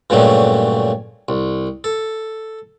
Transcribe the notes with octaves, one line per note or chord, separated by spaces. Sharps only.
G2 A#2 C#3 F#3 G3 A3
C2
A4